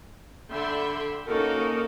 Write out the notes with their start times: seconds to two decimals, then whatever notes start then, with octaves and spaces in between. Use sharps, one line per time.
0.50 D3 E5 G5 B5 C6
1.26 A#3 C#4 D#4 F#4 A4 A#4